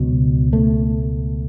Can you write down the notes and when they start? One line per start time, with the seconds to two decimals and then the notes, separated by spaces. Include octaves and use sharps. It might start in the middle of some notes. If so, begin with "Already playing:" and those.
Already playing: C#2 B2 F#3
0.53 A3